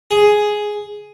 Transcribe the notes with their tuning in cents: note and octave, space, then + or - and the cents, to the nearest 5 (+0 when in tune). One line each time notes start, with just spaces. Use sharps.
G#4 +5